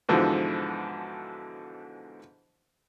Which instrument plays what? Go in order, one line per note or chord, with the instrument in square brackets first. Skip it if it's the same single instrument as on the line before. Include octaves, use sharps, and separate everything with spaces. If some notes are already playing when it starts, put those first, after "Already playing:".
[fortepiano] G#2 B2 D3 E3 F3